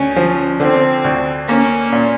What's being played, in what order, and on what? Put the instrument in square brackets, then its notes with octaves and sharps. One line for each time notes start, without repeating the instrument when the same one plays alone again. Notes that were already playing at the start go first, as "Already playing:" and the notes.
Already playing: [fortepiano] D2 [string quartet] C#4
[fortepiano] F3
[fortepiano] D3 [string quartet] C4
[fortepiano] D2
[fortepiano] A#3 [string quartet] C#4
[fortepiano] A#2